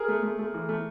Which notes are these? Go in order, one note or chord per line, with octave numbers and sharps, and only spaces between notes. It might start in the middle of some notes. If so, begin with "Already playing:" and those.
Already playing: G#4 A#4
A3
A3
A3
E3
A3